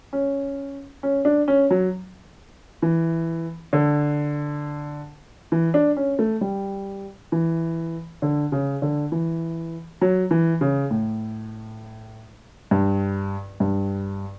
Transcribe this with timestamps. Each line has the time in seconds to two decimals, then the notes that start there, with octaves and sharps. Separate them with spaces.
0.13 C#4
1.03 C#4
1.25 D4
1.48 C#4
1.70 F#3
2.82 E3
3.73 D3
5.52 E3
5.74 D4
5.97 C#4
6.19 A3
6.41 G3
7.32 E3
8.22 D3
8.52 C#3
8.82 D3
9.12 E3
10.01 F#3
10.31 E3
10.61 C#3
10.91 A2
12.71 G2
13.60 G2